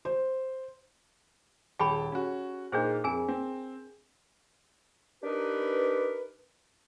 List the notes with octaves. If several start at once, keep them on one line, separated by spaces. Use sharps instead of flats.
C5
D#1 G4 G#4 G5 A5 B5
C#4 F#4
A#2 D4 D#4 G#4 C5
F2 G#4 A#4 G#5
C4
D4 D#4 G4 A#4 B4